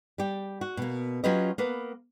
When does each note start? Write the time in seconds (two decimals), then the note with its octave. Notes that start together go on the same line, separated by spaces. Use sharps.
0.18 G3 G4
0.61 F#4
0.77 B2 A#3
1.24 F#3 C#4 F4 G4 B4 D#5
1.58 A#3 B3 B4